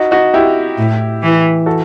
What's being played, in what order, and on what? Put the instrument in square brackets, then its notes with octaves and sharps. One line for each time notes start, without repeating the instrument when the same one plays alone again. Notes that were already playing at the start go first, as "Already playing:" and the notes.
Already playing: [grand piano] D#4 F#4
D#4 F#4
E4 G4
[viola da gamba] A2
E3
[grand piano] F#4 A4